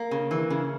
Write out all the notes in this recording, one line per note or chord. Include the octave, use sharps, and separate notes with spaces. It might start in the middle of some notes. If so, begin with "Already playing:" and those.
Already playing: A#3
C#3
E3
C#3